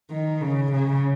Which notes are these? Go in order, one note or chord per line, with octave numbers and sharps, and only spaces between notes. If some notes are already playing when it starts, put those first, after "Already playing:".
D#3
C#3
C#3